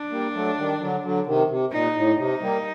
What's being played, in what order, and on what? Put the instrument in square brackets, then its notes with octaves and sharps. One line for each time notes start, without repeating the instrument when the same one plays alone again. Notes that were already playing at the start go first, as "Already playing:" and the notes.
Already playing: [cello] D4
[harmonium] G3 A#3
F#3 A3
D#3 G3
D3 F#3
D3 F#3
C3 D#3
C3
[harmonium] A#2 [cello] D#4
[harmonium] A2
[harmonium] C3 [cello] D#4
[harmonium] G3 A#3